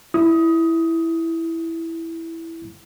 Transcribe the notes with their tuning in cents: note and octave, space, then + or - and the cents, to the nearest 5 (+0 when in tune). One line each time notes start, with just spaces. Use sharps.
E4 +0 D#6 +15